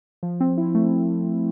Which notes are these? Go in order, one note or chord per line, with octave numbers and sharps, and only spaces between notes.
F3
C4
E4
A3